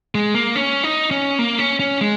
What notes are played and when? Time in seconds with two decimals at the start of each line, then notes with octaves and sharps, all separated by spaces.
0.15 G#3
0.35 A#3
0.55 C#4
0.84 D#4
1.11 C#4
1.39 A#3
1.59 C#4
1.80 C#4
2.01 G#3